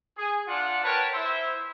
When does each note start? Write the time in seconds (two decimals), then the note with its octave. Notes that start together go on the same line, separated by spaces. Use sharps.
0.17 G#4
0.47 D4 F4 F#5
0.83 A#4 B4 C#5 G5 A5
1.13 E4 C5 E5